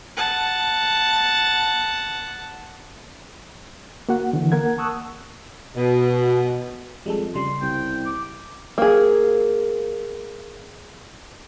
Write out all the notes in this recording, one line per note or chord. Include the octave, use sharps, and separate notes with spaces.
F#5 A5
A#3 F#4 F#5
D3 E3
A#3 A#4 F#5 G#6
A5 C#6 D#6 E6 F#6
B2
F2 G3 G#3 A4
C#3 G3 C6
C2 G5
D6
A#3 G#4